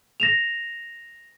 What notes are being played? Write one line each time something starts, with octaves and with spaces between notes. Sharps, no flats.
A#6 E7 F7